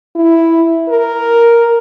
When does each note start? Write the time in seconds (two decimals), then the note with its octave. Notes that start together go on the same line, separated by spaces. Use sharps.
0.16 E4
0.89 A#4